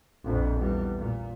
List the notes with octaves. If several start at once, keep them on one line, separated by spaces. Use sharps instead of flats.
A#1 F2
E2 G3
A#2